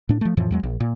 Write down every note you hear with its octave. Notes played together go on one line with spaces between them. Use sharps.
A2 D4
F3 A3
F2 A2 E3 F3
E2 F#3 G#3
A#1
A#2